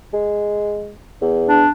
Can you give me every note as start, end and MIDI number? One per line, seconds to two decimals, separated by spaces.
0.13 0.92 56
1.21 1.64 40
1.49 1.69 62